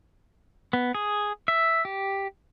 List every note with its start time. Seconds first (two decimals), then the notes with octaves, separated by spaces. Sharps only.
0.73 B3
0.95 G#4
1.48 E5
1.85 G4